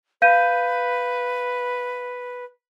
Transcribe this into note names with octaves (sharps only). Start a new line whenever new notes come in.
B4 F5 G6 D#7